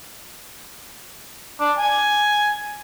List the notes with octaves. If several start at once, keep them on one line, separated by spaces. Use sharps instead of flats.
D4
G#5